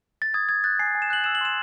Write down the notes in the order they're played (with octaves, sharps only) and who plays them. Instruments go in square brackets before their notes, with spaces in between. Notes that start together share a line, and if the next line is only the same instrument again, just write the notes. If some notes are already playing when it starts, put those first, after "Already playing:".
[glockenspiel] A6
D#6 G#6
D#6 G#6
F#6 A6
G#5 C7
G#5
E7
F#6 F#7
E6 E7
F#7
C6 E7